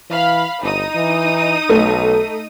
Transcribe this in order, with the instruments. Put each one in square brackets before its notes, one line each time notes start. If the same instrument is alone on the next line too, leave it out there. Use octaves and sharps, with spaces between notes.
[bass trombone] E3 [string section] F5 B5
[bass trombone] G1 [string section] D#4 D#6
[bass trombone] E3
[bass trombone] B1 [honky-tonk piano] A3